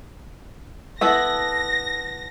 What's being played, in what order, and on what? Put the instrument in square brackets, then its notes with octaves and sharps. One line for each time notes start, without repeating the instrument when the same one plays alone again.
[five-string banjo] B3 E4 A4 [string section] A#6